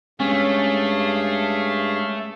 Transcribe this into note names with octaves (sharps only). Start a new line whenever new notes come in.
G2 G#3 A3 C#4 G#4 C#5 F5